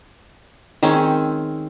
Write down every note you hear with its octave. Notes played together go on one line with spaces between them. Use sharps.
D#3 G#3 C4 C#4